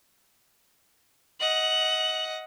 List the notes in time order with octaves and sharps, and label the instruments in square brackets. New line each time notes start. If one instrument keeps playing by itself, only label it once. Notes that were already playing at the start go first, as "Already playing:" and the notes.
[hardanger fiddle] D#5 F#5 [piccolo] F#7